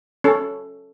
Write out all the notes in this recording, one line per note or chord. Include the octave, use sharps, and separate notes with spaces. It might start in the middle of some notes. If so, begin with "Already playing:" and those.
C#4 A4